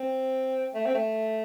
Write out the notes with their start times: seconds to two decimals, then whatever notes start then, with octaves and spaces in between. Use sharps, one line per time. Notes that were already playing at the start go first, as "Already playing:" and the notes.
Already playing: C4
0.75 A3
0.86 C4
0.95 A3